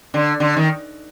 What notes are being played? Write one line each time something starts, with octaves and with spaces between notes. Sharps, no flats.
D3
D3
D#3